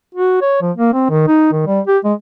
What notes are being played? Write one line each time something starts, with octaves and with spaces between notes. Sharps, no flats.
F#4
C#5
F3
A#3
C4
D#3
D#4
D#3
G3
G4
G#3